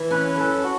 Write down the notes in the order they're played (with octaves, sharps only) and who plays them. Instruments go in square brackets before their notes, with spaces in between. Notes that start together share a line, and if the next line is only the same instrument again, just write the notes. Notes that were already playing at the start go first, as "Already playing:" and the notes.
Already playing: [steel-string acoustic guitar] E3
[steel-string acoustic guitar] C#4 [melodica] B4
[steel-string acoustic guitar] F#2 [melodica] A4
[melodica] F#4